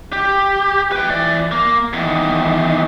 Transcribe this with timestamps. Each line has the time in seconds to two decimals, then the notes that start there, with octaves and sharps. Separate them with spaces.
0.13 G4
0.92 B4 G5
1.09 E3 D5
1.52 A#3
1.93 E2 D#3